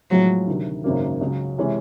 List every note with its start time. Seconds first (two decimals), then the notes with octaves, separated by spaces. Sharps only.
0.11 A2 F3 F#3 G#3
0.47 D2 C3 D#3
0.84 G#1 F#2 C#3 F#3 A#3
1.21 C#2 C#3 F#3
1.58 C3 E3 G#3 C#4